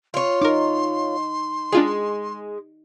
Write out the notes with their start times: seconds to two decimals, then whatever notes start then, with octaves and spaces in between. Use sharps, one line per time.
0.14 F4 C#5 C6
0.41 D#4 A#4 D6
1.72 G#3 D4 F4 G#4